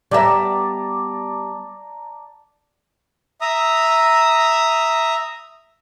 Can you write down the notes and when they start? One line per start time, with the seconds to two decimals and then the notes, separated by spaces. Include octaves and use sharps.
0.11 G3 B3 D5 E5 A5 A#5
3.41 E5 A#5 D#6